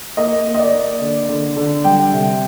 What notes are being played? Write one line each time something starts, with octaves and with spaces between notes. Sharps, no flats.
A#3 D#5
A#3
D#5
D5
A#3
D3
D3
D3
G3 G5
C3